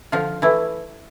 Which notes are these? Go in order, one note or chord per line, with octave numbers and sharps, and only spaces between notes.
D3 F3 F4
E3 A3 E4